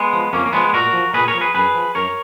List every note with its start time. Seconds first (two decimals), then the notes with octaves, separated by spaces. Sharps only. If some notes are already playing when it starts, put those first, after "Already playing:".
Already playing: G#3 B3
0.13 F3
0.33 F2 A#3 C#4
0.46 A#3
0.53 F3 G#3 B3
0.73 A#2 F#4 A#4
0.93 F3
1.14 A#2 G#4 B4
1.28 A#4 C#5
1.34 F3
1.41 G#4 B4
1.54 F#2 G#4 B4
1.75 F3
1.95 F#2 A#4 C#5